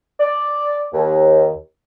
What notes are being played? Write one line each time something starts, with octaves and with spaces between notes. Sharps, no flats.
D5
D#2